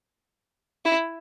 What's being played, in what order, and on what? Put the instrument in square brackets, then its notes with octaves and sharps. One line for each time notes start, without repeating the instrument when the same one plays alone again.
[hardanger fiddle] E4